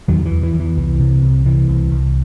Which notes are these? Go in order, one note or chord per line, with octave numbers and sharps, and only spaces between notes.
E2 D#3 F#3
E3
E2
E3
E2
E3
C2 E3
C3
C2
C3 E3
C2
C2